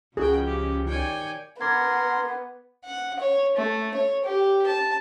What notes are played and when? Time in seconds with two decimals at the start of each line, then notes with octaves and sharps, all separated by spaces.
0.17 C#2 C#3 F3 F#4 G#4 G5
0.46 G4
0.87 D#3 C#5 D5 G5 G#5
1.61 B3 A#4 C6 D6 G#6
2.85 F#5
3.20 C#5
3.56 A3
3.94 C#5
4.25 G4
4.67 A5